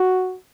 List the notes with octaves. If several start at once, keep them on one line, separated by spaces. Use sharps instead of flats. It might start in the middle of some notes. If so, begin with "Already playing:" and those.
Already playing: F#4